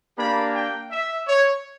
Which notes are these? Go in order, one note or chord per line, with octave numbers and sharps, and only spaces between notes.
A#3 D4 G4 B5
G5
E5
C#5